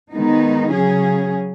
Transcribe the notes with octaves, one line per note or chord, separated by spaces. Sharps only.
D#3 G#3 B3 D#4
C#3 F#3 C#4 G#4